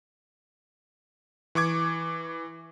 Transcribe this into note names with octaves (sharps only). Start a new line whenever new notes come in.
E3 C#6 D6 G#6